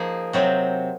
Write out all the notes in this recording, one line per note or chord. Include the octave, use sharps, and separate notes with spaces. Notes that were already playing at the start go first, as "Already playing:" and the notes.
Already playing: F3 A#3 D#4 G#4
C3 F#3 C4